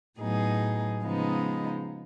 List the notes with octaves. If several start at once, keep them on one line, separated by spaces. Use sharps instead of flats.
A2 F#3 B3 D#4 G#4
C#3 F3 G#3 B3 D#4